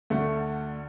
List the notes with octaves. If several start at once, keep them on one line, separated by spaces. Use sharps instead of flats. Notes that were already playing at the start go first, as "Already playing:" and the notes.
D2 D3 A3